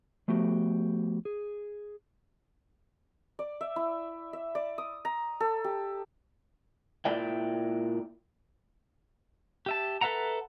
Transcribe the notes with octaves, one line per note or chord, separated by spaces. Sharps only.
F3 A3 B3 F#4 G4
G#4
D5
E5
E4
E5
D5
D#6
A#5
A4
G4
A#2 E4 D5 E5 G5
G4 E5 A5
A4 B4 E5 F#5 A#5